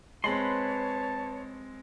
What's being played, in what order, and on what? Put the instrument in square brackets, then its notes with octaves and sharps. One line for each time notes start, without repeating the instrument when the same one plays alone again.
[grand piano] G#3 C4 [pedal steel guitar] B4 B5 C6 [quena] C#5 [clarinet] A5